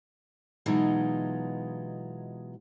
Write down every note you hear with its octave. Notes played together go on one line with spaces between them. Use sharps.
B2 E3 F#3 G#3 D#4 F4